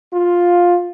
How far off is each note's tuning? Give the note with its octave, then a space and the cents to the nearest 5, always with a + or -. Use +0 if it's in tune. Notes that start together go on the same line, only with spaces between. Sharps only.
F4 +10